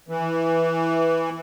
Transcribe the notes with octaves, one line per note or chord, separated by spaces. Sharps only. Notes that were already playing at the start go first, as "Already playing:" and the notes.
E3